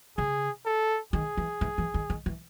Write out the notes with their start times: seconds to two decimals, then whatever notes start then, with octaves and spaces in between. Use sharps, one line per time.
0.17 C#3 G#4
0.66 A4
1.13 D#3 G#4
1.37 E3
1.61 E3
1.78 E3
1.94 D#3
2.10 D#3
2.26 E3